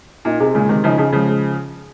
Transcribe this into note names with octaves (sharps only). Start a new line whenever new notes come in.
A#2 D#4
C3 G#4
A#2 C#3 G#3
C3 D#3 G#3
C#3 F3 D#4
C#3 F3 G#4
C#3 F3 G#3
G#3